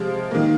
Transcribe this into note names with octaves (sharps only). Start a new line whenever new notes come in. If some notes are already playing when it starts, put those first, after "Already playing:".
Already playing: C3 F3 G#3 F5
D#3 A#3